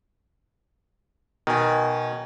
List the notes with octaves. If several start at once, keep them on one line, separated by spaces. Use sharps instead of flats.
B2 D#3 G#5